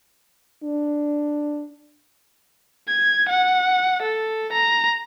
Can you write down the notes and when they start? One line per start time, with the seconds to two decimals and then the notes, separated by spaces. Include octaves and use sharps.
0.64 D4
2.88 G#6
3.29 F#5
4.02 A4
4.53 A#5